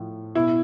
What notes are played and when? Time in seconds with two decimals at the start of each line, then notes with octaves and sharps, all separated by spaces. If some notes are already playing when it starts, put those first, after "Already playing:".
Already playing: A2 F3
0.35 B2 E4